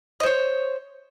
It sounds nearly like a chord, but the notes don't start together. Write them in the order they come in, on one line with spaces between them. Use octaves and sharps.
D#5 C5 C#5